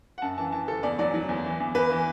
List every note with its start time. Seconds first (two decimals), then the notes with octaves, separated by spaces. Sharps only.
0.18 F#5
0.22 F#2 A5
0.38 E3 A5
0.52 E3 A5
0.68 F#1 A4
0.83 E2 D5
0.99 F#3 D5
1.14 F#3
1.29 E2
1.44 E3
1.60 E2
1.75 E2 B4
1.90 E3